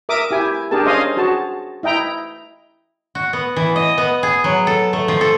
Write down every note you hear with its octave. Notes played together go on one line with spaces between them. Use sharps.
A#4 E5 D6 D#6
E4 G4 G#5
D4 G4 G#4 A#4 A5
C#4 C5 D#5 F5 G#5 D#6
F#4 G#4 A5
E4 D#5 G5 A#5
F#4
B3
E3
D#5
B3
G#4
F#3
A4
A3
F3
A4